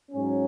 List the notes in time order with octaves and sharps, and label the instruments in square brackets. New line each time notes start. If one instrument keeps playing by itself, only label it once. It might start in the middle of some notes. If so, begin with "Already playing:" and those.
[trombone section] G#2 F#3 C#4